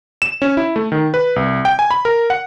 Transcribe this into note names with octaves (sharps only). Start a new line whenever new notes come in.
E7
C#4
E4
A3
D#3
B4
C2
G5
G#5
B5
A#4
F#5